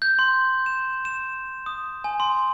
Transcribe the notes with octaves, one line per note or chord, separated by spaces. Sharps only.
G6
C6
E7
E7
D#6
G#5
C6